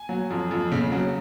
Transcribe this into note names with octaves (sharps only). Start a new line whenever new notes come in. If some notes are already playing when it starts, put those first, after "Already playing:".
Already playing: G#5
F#3
F2
F2
C#3
F#3